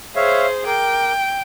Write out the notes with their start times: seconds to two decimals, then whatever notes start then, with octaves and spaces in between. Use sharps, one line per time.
0.16 G#4 C5 C#5 E5 F5
0.66 A#4 G5 D6